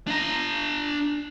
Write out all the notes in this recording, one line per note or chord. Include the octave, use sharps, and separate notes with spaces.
D4 A#5